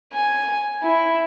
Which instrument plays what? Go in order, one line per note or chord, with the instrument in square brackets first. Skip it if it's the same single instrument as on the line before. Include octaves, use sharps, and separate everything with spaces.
[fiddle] G#5
E4